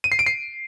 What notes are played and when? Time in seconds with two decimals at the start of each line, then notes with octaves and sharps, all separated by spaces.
0.04 D#7
0.12 C7
0.19 D7
0.26 C7